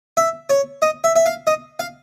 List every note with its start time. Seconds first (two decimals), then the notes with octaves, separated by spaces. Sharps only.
0.17 E5
0.50 C#5
0.82 D#5
1.04 E5
1.16 E5
1.26 F5
1.47 D#5
1.79 F5